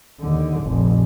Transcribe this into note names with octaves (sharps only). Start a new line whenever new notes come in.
D#2 D3
F1 A#1